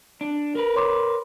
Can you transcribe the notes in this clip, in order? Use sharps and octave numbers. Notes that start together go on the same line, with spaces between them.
D4
A#4 B4
C#5 C6 D6